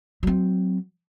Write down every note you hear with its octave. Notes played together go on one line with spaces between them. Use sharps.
F#3 C4